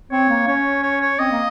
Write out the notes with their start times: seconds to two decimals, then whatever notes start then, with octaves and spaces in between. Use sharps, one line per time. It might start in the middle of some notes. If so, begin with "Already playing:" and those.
0.12 C4 C#5
0.29 A#3
0.47 C#4 C#5
0.83 C#5
1.01 C#5
1.19 C4 D#5
1.31 A#3